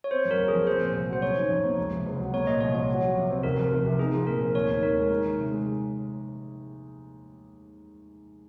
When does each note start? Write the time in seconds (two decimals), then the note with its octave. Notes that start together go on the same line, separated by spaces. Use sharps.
0.04 C#5
0.11 C4 C5
0.25 F#2
0.31 A#4
0.39 F#1
0.48 G#4
0.53 F3
0.67 C4 C5
0.81 A#2
0.94 C2
1.09 F#3 C5
1.22 C#4 C#5
1.36 D#3
1.50 F2
1.65 A#3
1.78 C#2
1.92 C3
2.06 C#2
2.19 F#3
2.33 A#3 C#5
2.47 A#2 D#5
2.60 C2 C#5
2.74 F3 C#5
2.89 F#4
3.03 F#3
3.16 C3
3.30 C4
3.43 F1 A#4
3.57 F2
3.72 F1
3.85 C3
3.99 D#4 G#4
4.13 F3
4.26 A#2 A#4
4.41 C4
4.55 D#2 C#5
4.69 D#3
4.82 D#2 A#4
4.97 G#3
5.10 D#4
5.25 D#3
5.38 C3
5.51 G#3